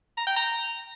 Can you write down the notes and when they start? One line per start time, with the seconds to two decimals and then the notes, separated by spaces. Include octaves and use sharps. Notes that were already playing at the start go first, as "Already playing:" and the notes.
0.17 A#5
0.27 G5
0.36 A#5